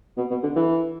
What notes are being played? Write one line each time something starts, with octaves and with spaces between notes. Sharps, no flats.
B2
B2
D3
E3